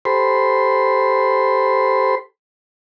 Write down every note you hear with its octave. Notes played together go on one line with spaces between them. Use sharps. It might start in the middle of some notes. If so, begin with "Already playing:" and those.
G4 A4 C5 B5 C6